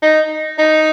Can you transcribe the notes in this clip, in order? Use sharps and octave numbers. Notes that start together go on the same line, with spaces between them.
D#4
D#4